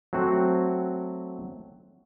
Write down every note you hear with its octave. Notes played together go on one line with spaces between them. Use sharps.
F#3 A3 C4 F#4